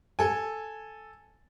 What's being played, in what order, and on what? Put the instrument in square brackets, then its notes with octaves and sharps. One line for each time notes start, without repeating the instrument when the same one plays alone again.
[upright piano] A4 G#5